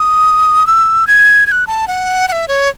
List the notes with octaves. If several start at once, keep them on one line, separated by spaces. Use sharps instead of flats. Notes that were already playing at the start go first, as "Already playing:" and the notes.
Already playing: D#6
E6
G#6
G#6
F#6
A5
F#5
F#5
E5
C#5